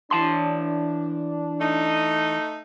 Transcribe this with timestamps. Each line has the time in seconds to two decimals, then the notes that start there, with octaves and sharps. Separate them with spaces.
0.11 E3 D4 A5 C6
1.59 A3 D#4